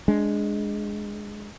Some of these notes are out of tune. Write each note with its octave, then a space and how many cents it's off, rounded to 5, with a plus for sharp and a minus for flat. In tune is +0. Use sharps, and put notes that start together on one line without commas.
G#3 +0 D4 +0